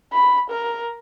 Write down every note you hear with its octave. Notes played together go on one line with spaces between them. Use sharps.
B5
A#4